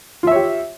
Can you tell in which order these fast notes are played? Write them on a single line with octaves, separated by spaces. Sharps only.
F4 E5 C#5 G4